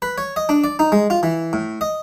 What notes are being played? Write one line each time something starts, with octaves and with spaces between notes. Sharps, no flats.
B4
C#5
D#5
D4
D5
D#4
G#3
F4
E3
A2
D#5